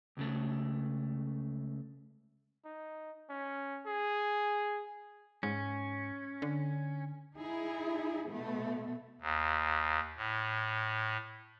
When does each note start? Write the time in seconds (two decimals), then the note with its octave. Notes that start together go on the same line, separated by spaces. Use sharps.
0.17 C#2 C#3 A3
2.65 D#4
3.30 C#4
3.86 G#4
5.43 G#2 C#4
6.42 D3
7.38 D#4 E4 G#4
8.27 B2 A3 B3
9.21 D#2
10.17 A2